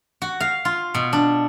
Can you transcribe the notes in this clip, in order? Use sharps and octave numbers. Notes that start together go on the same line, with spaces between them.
F#4
F5
F4
B2
D4